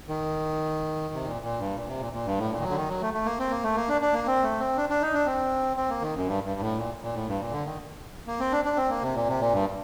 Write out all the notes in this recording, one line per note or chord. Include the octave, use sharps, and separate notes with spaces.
D#3
C3
A#2
A#2
G2
A#2
C3
A#2
A#2
G2
A2
A#2
D#3
F#3
D3
D#3
F#3
A3
A3
A#3
C4
A#3
A3
A#3
D4
D4
A#3
C4
A3
C4
D4
D4
D#4
D4
C4
C4
A#3
D#3
F#2
G2
G2
A2
A#2
A#2
A2
G2
A#2
D3
D#3
A#3
C4
D4
D4
C4
A#3
C3
A#2
C3
A#2
G2